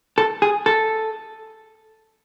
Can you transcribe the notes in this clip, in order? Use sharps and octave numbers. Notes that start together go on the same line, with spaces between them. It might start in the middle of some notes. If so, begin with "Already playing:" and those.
A4
G#4
A4